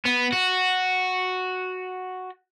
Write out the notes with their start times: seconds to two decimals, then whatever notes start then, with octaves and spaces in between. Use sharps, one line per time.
0.05 B3
0.33 F#4